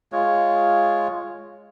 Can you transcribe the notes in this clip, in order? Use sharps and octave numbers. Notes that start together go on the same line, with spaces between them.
G#3 F4 C#5